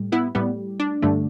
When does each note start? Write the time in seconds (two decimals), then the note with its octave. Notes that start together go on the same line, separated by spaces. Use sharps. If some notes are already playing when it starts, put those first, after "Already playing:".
Already playing: A2 G3
0.12 B3 E4
0.35 A2 G3 B3
0.80 D4
1.02 G2 D3 A3